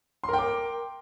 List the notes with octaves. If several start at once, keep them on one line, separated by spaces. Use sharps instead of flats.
A#4 G5 C6 D6